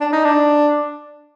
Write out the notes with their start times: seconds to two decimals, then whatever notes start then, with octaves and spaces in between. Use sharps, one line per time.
0.01 D4
0.13 D#4
0.25 D4